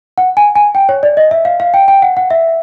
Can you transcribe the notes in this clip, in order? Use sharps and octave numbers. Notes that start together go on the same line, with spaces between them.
F#5
G#5
G#5
G5
C#5
D5
D#5
E5
F5
F5
G5
G5
F#5
F#5
E5